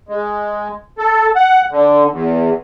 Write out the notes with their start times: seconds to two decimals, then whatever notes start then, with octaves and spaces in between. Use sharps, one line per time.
0.09 G#3
0.98 A4
1.36 F#5
1.71 D3
2.11 E2